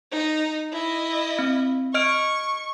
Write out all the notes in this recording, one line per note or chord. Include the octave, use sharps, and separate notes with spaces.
D#4
E4 D#5
C4
D#5 C#6 F6 D7